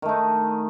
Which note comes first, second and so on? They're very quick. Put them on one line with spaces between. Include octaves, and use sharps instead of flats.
D#3 A3 D#4